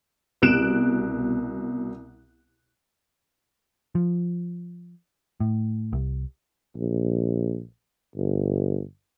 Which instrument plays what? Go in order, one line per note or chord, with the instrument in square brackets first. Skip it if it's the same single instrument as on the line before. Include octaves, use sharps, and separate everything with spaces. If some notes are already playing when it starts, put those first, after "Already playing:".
[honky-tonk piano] C2 B2 F#6 D7 E7
[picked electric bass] F3
A2
C2
[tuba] A#1
G1